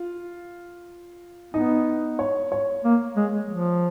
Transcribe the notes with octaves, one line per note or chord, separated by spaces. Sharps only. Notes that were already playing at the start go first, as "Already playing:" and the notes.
Already playing: F4
B3 D#4
C#5
C#5
A#3
G#3
F3